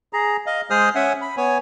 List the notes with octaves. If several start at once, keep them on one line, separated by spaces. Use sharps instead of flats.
G#4 A#5
D#5 F5
G#3 G#4 C5 D#6 F6
C#4 E5 F#5 G#5
B5
B3 C#5 G#5